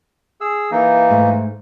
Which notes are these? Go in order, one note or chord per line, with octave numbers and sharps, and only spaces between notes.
G#4 E6
E3 A#3 D#4
G#2 A3